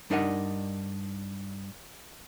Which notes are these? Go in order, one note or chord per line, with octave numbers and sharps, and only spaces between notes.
G2 D4 D#4 A#4 D#5 F#5